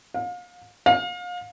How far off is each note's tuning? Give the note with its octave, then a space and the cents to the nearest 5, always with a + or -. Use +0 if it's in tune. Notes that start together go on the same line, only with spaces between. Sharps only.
F5 +35
F5 +30